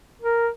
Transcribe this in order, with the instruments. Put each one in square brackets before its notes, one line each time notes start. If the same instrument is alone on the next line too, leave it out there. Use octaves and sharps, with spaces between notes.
[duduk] A#4